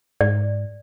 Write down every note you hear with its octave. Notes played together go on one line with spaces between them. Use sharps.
G#2 D5